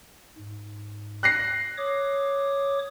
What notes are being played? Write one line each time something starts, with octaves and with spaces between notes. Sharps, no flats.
G#2
F#6 A#6 C7
C#5 D6 D#6